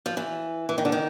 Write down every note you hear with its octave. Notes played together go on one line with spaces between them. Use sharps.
F3
E3
E3
D#3
D3
D#3